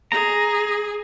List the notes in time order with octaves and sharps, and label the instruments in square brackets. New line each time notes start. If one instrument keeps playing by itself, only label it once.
[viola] G#4 [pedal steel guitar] A#5